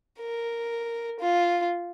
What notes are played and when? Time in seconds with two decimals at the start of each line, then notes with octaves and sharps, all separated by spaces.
0.20 A#4
1.19 F4